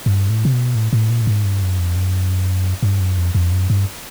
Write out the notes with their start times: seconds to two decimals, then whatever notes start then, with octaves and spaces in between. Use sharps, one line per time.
0.06 G2
0.30 A2
0.45 C3
0.53 B2
0.75 A2
0.93 A2
1.10 A#2
1.21 A2
1.27 G#2
1.45 G2
1.63 F#2
1.79 F2
1.96 F#2
2.83 G2
3.00 F#2
3.18 F2
3.35 F2
3.52 F#2
3.70 G2